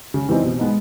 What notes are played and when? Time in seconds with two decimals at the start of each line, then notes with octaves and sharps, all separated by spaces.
0.14 C#3
0.29 E3 G3 C4 D#4
0.43 B2
0.59 G#3 B3 D#4